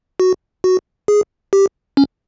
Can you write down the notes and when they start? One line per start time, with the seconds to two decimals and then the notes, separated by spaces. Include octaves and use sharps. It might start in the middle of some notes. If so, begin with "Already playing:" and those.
0.20 F#4
0.64 F#4
1.08 G#4
1.53 G4
1.97 C#4